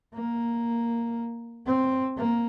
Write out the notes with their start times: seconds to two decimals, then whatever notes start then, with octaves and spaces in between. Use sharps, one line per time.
0.14 A#3
1.66 C4
2.17 A#3